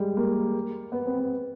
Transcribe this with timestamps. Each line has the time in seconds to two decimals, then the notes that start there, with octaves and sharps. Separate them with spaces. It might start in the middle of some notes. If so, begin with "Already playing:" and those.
Already playing: G3 G#3
0.17 A#3
0.92 B3
1.06 C4
1.19 B3